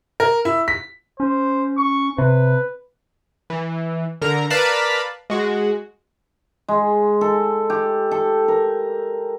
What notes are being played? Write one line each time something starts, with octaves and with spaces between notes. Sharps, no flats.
A#4
E4
B6
C#4 C5
C#6
C3 B4
E3
D3 A#4 A#5
A#4 B4 D5 F5 A5 B5
G#3 F#4
G#3
A4
G4
A4
A#4